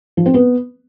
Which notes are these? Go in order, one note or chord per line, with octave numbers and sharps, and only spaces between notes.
F3
C4
B3